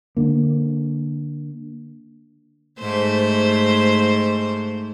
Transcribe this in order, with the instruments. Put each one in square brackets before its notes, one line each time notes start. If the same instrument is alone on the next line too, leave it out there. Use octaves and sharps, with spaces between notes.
[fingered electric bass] D3 A#3
[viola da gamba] G#2 A3 C5